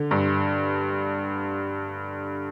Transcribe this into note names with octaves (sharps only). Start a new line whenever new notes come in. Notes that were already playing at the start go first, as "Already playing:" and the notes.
Already playing: D3
G2